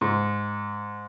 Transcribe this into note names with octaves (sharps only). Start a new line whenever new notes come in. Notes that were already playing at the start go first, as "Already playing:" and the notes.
G#2